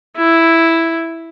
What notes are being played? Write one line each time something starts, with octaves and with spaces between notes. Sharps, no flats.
E4